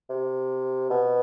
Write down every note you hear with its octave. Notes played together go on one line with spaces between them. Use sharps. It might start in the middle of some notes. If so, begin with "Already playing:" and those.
C3
B2